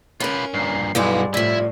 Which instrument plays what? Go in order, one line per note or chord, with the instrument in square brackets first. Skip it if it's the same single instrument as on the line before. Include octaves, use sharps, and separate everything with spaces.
[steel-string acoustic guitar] C#4 A#4 [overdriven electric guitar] F4 B4
[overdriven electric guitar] G2 A#2 [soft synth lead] C7
[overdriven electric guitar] B1 [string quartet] G2 G3 G#3 [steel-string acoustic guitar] E3 B3 E4 [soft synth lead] F5
[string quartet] A2 [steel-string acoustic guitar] C3 F3 [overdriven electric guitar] E4 E5 [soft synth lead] D5